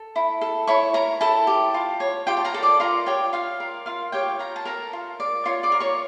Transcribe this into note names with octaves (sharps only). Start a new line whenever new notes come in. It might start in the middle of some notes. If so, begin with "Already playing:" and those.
Already playing: A4 A5
E4
A4
E4 C#5 C#6
A#4 C#5 A#5
E4 A4 A5
G4
F4
C#5
F4 G4 G5
A5
A#4 A#5
A4
D5 D6
F4 A#4 A#5
G4 C#5 G5
F4 F5
A#4
F4 F5
G4 C#5 G5
F4 A#4 A#5
A5
A4 A#4 A#5
F4
D5
F4 C#5 C#6
D5 D6
A#4
C#5 C#6